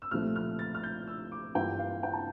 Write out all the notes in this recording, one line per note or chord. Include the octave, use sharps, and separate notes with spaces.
E6
C2 A#2 F3 A3 F6
F6
A6
F6
G6
E6
D6
G2 E3 A#3 D4 F4 G5
F5
G5
A5